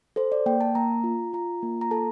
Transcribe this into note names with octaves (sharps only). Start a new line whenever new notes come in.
A4 C5
D5
A#3 G5
A5
A#3 A#5
F4
F4 A#5
A#3
A#5
A4 A5